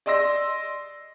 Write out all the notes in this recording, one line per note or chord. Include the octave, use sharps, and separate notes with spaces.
D5 D#5 C6 E6 A#6